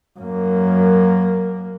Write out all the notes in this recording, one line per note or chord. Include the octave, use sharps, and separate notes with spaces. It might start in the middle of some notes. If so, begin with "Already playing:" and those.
F#2 A#3